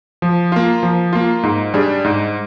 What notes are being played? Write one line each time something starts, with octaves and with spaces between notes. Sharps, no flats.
F3
A#3 F4
F3
A#3 F4
G#2
G3 D4 G#4
G#2